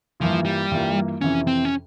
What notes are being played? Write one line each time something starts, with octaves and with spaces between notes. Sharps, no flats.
G2 E3 F3 A#3 F4
G3
G2 E3 A#3 F4
F2 C3 E3 C#4
C4
C#4